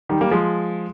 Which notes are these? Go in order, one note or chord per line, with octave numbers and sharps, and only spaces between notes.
D#3 G3
G3 A#3
F3 G#3